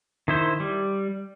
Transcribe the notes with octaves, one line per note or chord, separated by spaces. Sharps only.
D#3 E4 C5
G3